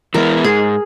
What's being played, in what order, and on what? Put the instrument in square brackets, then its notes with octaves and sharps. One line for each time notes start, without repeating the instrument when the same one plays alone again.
[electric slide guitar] E3 G#3 B3 E4 [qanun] A#4
[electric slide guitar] G#2 [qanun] G#4